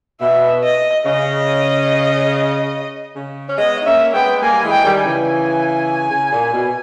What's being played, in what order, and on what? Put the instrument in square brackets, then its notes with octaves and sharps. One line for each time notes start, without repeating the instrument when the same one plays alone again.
[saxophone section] B2 [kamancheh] E5
[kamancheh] D#5
[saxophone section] C#3 [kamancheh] D#5
[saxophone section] C#3
C#4
[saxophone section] G#3 B3 [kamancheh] D#5
[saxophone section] D#4
[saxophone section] A#3 C#4 [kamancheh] E5
[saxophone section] G#3 B3 [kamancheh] G5
[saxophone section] G3 A#3 [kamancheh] G#5
[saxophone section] E3 G#3
[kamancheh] G5
[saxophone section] D#3 G3
[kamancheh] G#5
[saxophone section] C#3 E3
[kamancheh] G#5
[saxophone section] C#3
A#2
B2